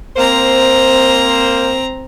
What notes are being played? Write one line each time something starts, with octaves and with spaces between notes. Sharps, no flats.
A#3 C4 C5 A#5